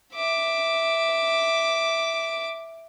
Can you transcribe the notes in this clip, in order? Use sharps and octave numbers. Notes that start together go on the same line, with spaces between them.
E5 D6